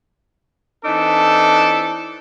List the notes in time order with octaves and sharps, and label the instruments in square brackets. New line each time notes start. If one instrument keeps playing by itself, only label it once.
[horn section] E3 C4 D4 D#4 A4